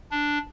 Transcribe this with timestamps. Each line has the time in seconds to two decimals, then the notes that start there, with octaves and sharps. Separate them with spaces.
0.11 D4